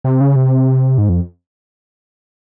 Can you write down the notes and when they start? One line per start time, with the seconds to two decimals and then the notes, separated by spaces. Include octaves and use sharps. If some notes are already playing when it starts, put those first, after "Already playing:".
0.04 C3
0.21 C#3
0.36 C3
0.98 G#2
1.09 F2